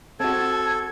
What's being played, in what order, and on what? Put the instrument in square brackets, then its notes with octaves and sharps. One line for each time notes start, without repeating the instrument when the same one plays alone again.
[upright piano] C4 F#4 [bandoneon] A4 [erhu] A5 [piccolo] G#6